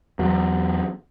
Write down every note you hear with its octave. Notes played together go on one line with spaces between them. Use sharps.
E2 F#3